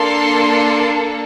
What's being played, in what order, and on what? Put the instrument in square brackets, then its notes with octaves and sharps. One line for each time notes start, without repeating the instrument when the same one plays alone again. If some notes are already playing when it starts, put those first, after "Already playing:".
Already playing: [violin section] A#3 D4 A4 C6